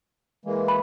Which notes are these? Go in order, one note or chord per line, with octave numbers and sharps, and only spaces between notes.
E3 G#3 A#3
B5